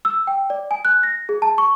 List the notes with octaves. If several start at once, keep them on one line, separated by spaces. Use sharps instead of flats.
E6
G5
D5
G#5
F#6
A#6
G#4
A5
C#6